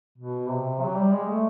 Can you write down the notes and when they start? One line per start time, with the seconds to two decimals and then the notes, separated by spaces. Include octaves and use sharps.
0.18 B2
0.50 C3
0.81 F#3
0.97 G3
1.12 G#3
1.28 A3